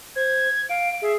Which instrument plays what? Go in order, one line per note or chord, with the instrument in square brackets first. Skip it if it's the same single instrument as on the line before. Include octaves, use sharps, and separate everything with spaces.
[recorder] C5 [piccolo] G#6
[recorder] F5 [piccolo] D7
[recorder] G#4 [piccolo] E5